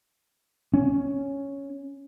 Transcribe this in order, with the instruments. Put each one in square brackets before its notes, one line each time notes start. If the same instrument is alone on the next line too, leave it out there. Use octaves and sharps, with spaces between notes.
[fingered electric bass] C#4